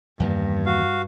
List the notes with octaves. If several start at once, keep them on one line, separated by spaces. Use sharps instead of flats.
E2 G2 D#3 A#3
F#4 F5